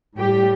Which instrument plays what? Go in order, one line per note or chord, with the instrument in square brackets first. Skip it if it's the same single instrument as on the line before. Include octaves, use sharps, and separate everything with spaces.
[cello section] A2 G3 G4